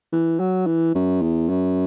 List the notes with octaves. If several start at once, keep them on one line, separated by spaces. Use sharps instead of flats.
E3
F#3
E3
F#2
E2
F#2